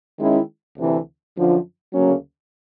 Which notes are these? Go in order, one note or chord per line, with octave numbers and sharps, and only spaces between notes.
D#3 G#3 C#4 E4
D2 C3 E3
F#2 D3 F3
D2 C#3 F#3 A#3 C#4